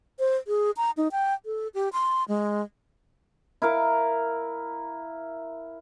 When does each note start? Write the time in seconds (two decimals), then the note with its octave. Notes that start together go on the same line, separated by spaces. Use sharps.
0.19 C5
0.47 G#4
0.77 A#5
0.97 D#4
1.12 G5
1.46 A4
1.74 G4
1.93 C6
2.28 G#3
3.62 E4 A#4 F5 A#5